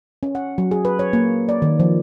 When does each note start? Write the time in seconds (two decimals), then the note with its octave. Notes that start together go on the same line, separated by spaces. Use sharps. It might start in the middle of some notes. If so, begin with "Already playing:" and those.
0.23 C#4
0.35 F#5
0.58 F#3
0.71 G#4
0.85 B4
0.99 C#5
1.13 A#3
1.49 D5
1.62 D#3
1.80 F3